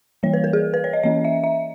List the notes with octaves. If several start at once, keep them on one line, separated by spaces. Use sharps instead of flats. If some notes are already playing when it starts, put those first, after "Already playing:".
E3 G3 A#3 C#5
B4
A#4
G#4
B4
C#5
D#5
E3 A#3 C#4 D#5
E5
E5